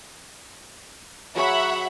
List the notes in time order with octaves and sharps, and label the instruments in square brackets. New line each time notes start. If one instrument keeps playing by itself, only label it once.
[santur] F#3 G#4 C#5 [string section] E5 F#5 B5